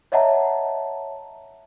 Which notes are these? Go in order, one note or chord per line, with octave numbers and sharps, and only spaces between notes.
C#5 D#5 E5 F#5 A5 A#5